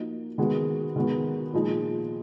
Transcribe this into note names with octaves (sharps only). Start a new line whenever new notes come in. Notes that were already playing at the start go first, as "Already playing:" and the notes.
Already playing: F3 A#3 D#4 F#4
D#3 G#3 B3 F#4
D#3 G#3 B3 F#4
A#2 F3 G#3 D#4